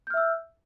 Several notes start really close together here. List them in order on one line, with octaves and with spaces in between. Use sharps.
G6 F6 E5 E6